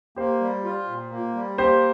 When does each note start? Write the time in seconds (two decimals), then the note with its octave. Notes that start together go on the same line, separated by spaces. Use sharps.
0.16 A#3 G4 C5
0.41 G3
0.64 F4
0.88 A#2
1.11 A#3
1.35 G3
1.58 A#3 G4 C5